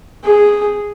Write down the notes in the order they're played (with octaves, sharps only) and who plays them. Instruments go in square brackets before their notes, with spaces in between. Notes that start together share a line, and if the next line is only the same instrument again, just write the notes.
[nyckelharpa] G#4